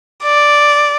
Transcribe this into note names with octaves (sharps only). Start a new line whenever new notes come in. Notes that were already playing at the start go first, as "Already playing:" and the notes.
D5